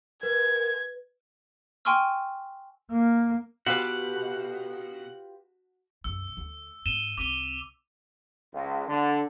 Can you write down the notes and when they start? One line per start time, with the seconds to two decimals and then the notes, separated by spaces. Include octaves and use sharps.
0.23 A#4 B4 G#6
1.85 G5 G#5 C6 C#6 E6 F6
2.91 A#3
3.66 B2 F4 G4 B4 F#5
6.04 B1 F#2 E6
6.37 D2
6.86 G#2 D#7 E7 G7
7.18 C2 C4 D6 D#7 G7
8.53 C#2
8.87 D3